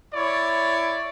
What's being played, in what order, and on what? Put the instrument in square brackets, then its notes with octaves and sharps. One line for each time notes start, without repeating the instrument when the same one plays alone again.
[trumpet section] E4 C#5 D5